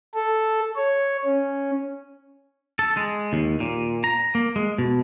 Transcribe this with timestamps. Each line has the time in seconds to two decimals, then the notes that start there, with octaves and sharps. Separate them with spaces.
0.14 A4
0.76 C#5
1.24 C#4
2.79 A4
2.97 G#3
3.33 D#2
3.60 A#2
4.04 A#5
4.35 A#3
4.56 G#3
4.78 B2